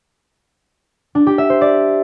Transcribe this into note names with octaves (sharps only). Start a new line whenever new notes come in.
D4
G4
E5
C5
D5